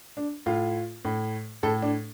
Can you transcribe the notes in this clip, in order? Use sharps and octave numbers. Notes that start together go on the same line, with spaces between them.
D4
A2 F4
A2
A2 A4
D4